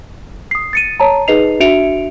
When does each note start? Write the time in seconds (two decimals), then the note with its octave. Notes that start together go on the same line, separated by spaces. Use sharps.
0.51 D#6 C7
0.73 A6 C#7 D#7
1.00 C#5 A5 A#5
1.28 D#4 G#4 B4 D#5 C7 F7
1.60 D4 F#4 E5 C#7 D7 F7